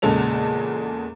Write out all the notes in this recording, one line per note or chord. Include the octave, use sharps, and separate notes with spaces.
E2 A#2 C#3 G#3 A4 F7